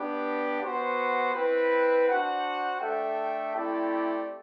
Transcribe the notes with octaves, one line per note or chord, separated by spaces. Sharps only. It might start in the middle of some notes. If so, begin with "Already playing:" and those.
Already playing: B3 D4 G4
B3 F#4 C5
C4 E4 B4
D4 F#4 C5 F#5
A3 D4 A4 E5 G5
A3 C4 E4 G4 D5